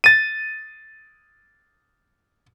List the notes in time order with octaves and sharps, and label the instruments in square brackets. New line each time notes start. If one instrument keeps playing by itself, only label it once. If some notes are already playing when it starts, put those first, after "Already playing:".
[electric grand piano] A6 D#7